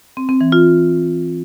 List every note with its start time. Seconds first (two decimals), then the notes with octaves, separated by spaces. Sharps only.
0.17 C4
0.29 C4
0.41 E3
0.52 F4